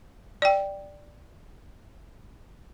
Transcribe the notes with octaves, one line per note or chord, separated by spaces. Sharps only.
D5 G5